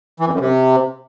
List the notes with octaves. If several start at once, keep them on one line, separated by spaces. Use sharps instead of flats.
E3
F2
F#2
C3